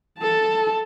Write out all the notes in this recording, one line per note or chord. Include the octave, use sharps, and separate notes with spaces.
A4 A5